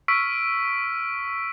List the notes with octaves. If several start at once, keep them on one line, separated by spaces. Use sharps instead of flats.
C#6 E6 F6 B6 D7